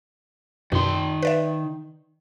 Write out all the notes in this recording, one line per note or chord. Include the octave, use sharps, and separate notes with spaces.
F#2 B2 D#3 C6
B4 D5 E5